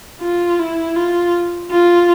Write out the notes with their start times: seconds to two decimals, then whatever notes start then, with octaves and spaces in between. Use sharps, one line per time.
0.21 F4
0.59 E4
0.96 F4
1.71 F4